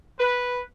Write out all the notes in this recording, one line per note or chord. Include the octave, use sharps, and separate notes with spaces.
B4